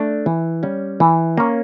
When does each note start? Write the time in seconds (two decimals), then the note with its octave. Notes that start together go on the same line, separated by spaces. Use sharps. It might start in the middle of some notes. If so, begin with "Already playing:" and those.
Already playing: A3 D4
0.26 E3
0.63 G3 C#4
1.00 E3
1.38 A#3 C#4